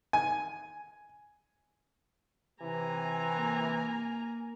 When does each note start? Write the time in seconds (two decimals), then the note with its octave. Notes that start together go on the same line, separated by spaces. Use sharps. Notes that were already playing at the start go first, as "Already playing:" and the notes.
0.13 G#5
2.62 C3 E3 G#5 A#5
3.35 A#3